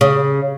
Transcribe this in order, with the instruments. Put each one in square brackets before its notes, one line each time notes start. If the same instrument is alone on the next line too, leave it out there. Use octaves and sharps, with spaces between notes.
[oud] C#3